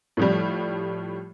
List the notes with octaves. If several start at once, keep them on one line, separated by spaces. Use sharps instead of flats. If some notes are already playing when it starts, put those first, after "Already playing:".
A2 F3 G3